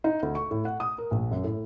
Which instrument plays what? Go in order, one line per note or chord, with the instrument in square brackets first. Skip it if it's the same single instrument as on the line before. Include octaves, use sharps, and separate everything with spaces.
[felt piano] D#4
D2
C#6
A2
F#5
D#6
A#4
A#1
F#2
A2